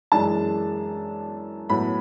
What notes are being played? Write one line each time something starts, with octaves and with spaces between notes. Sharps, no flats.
F#2 E3 G#3 D4 A5
A2 F#3 B3 B5